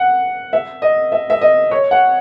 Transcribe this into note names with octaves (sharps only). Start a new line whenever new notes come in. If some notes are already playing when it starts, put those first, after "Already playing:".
Already playing: F#5
E5
D#5
E5
E5
D#5
C#5
F#5